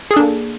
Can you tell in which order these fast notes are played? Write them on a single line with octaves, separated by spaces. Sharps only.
G#4 A4 D4 A#3